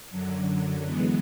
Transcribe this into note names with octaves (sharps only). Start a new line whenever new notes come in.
F#2 D3 F#3
E3 G#3 B3